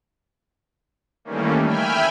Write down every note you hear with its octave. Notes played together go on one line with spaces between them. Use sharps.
D#3 E3 G3 A3 A#3 C#4
E5 G5 G#5 B5 F6